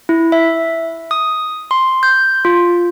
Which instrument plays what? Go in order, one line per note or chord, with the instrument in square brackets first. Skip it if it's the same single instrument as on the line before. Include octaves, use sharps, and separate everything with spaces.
[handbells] E4
E5
D#6
C6
G6
F4